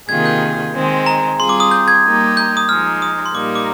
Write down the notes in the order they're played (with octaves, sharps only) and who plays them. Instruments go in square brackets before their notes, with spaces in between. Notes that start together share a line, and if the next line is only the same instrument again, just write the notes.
[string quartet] C3 D#3 A#3 F4 G#4 [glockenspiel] G#6
[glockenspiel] G6
[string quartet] D#3 G#3 C4
[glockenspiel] A#5
[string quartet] G3 C4 F4 G#4 [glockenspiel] C6
[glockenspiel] D6
D#6
G6
G#6
[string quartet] G3 A#3 D#4 G4
[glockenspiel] G6
D#6
[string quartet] F3 G#3 D#4 [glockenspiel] F6
[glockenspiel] D#6
C6
[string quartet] A#2 G3 A#3 D#4 [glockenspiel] D6
[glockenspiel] D6